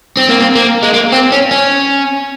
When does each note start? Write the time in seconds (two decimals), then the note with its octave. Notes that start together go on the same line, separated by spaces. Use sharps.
0.17 C4
0.29 A#3
0.40 C4
0.55 A#3
0.82 G#3
0.93 A#3
1.12 C4
1.32 C#4
1.51 C#4